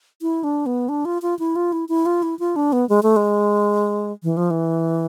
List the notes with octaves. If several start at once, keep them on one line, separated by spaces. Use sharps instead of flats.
E4
D4
B3
D4
F4
F4
E4
F4
E4
E4
F4
E4
F4
D4
B3
G#3
A3
G#3
E3
F3
E3